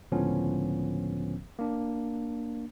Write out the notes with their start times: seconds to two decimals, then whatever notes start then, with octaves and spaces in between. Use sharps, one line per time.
0.12 C#2 A2 D3 F3 B3 C#4
1.59 A#3 D4